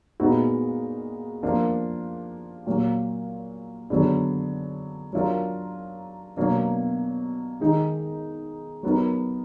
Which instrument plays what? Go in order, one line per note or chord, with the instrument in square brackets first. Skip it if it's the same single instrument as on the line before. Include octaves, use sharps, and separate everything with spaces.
[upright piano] A#2 G#3 B3 D#4 F#4
F3 A#3 D4 F4 A#4
A#2 F#3 A#3
D3 F#3 B3 D4 G#4
F#3 D4 F4 A#4
B2 F#3 A#3 D4
D#3 G#3 D#4
F#3 B3 D#4 A#4